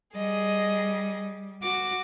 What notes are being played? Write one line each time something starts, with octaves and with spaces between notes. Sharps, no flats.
G3 G#4 D#5
F#4 D6